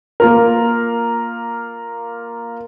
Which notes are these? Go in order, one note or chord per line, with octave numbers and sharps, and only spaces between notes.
A#3 F4 A#4